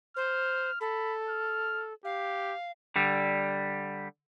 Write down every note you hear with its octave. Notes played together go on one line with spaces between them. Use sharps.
C5 F6
A4 B5
F6
G4 F5
D3 G3